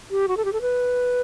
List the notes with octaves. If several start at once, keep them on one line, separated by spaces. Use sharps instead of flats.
G4
F#4
A4
G4
A4
B4